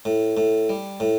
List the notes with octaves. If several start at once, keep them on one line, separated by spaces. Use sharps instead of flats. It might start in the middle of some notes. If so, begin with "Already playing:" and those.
A2
A2
G3
A2